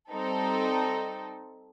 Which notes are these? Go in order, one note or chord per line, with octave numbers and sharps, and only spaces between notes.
G3 C4 D#4 A4